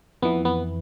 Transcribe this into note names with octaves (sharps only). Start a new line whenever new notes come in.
F2 E3 B3
B3